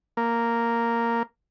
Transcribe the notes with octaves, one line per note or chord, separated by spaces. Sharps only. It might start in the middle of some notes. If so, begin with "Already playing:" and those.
A#3